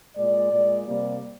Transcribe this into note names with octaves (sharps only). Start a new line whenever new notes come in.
A#2 G#3 D5
A#2 G#3
C3 G3 A#3 D5